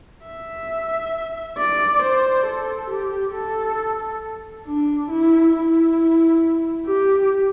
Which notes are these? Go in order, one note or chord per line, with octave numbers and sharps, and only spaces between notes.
E5
D5
C5
A4
G4
A4
D4
E4
E4
G4